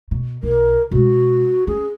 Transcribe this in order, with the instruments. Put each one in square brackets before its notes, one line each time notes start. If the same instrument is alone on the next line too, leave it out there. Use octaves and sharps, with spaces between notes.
[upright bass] B2
[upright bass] B1 [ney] A#4
[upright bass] B2 G#3 [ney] F#4
[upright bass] C#4 [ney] G#4